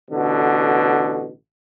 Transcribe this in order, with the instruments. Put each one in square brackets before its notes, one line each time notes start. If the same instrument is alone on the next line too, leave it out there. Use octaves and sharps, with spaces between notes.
[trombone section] A1 B2 D3